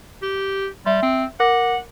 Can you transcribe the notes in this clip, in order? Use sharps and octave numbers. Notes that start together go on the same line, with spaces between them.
G4
G3 E5 C6
C4
A#4 F#5 D6 A#6